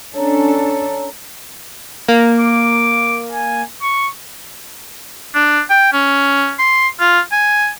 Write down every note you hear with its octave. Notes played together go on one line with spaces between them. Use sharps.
C#4 D4 A4 C#5 A#5
A#3
D6
G#5
C#6
D4
G5
C#4
C6
F4
G#5